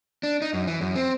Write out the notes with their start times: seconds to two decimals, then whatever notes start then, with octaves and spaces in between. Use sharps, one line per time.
0.23 D4
0.42 D#4
0.54 F#2
0.67 E3
0.81 F#2
0.96 C4